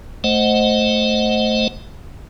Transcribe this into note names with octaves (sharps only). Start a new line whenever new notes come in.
A3 C5 D#5 F#5